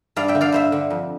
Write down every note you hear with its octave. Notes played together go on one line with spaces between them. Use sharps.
G2 D5 F5
E5 G5
D3
D5 F5
G2 C5 E5
D3
F2